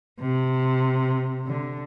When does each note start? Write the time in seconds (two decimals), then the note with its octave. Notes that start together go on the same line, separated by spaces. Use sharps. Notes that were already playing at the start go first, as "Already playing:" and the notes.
0.21 C3
1.47 D3